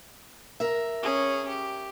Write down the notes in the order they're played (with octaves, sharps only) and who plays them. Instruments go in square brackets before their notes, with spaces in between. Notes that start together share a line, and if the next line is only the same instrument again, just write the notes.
[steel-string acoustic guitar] A#4 E5
[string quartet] C#4 G#4 C#5
G4